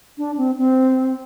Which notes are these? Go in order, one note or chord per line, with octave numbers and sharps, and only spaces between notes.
D4
C4
C4